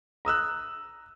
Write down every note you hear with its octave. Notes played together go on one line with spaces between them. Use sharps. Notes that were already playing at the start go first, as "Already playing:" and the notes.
A#5 D#6 E6 F#6